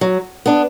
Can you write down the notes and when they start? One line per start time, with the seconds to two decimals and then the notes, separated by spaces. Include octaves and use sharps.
0.01 F#3
0.46 B3 D4